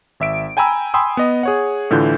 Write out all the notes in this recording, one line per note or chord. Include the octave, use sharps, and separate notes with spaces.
G#1 E5 D7
G5 G#5 A#5 B5 E6
G5 G#5 B5 C6 D#6 E6
B3 D#5
G#4 C#5 F#5
A2 D3 E3 F4 G6